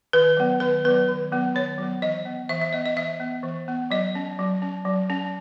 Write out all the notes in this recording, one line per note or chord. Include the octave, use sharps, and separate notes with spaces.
D#3 B4
F#3 B3
D#3 B4
F#3 B3 B4
D#3
F#3 B3
D#3 C#5
F#3 B3
E3 D#5
B3
E3 E5
E5
B3 D#5
D#5
E3 E5
B3
E3
B3
F#3 D#5
C#4
F#3
C#4
F#3
C#4